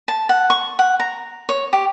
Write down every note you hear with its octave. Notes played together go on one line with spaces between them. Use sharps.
A5
F#5
C#6
F#5
A#5
C#5
G4